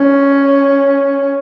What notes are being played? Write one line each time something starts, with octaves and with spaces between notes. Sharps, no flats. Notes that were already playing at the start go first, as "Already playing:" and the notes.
Already playing: C#4